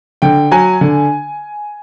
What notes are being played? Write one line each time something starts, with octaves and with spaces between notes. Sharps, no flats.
D3 G5
F#3 G#5
D3